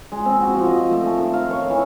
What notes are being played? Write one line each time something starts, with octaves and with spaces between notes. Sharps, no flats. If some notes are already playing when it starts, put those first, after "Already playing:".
G#3
C4
F#4
F3
D#5
A3
A5
D#3
F5
C#5
E3